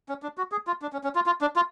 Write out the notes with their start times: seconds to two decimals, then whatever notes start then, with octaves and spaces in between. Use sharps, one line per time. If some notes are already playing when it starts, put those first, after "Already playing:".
0.09 C#4
0.23 D4
0.38 F#4
0.52 G#4
0.67 F4
0.82 D4
0.93 C#4
1.04 C#4
1.15 F4
1.26 F4
1.41 D4
1.56 F4